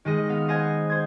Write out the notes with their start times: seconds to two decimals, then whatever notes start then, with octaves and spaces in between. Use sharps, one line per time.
0.05 D#3 G#3 D#5
0.29 B3 F5
0.48 C5 D#5 F#5 G#5
0.90 C5 G#6